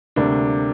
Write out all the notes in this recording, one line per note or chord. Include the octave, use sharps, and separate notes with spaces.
D2 C3 G3 A#3 D4